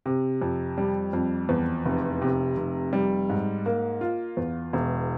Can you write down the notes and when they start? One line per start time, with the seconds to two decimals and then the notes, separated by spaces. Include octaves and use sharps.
0.06 C3
0.42 F2
0.78 G3
1.13 F2
1.49 E2
1.85 F1
2.22 C3
2.57 F1
2.93 G3
3.30 G#2
3.66 A#3
4.01 F4
4.37 E2
4.73 E1